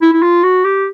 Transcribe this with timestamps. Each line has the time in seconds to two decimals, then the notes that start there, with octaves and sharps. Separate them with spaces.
0.02 E4
0.13 E4
0.23 F4
0.43 F#4
0.65 G4